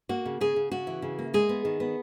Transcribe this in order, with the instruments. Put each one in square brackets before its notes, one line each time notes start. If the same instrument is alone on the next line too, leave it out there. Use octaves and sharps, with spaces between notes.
[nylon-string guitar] A#3 F#4
C#3
C#3 G#4
C#3
C#3 F#4
E3
C#3
A#3
G#3 G#4
B3
D#3
B3